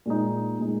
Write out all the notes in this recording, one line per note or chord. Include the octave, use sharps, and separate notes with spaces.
A#2 G#3 D#4
A#2 G#3 D#4